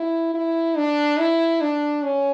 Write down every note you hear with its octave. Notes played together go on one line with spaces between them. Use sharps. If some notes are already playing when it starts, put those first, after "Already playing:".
Already playing: E4
E4
D4
E4
D4
C#4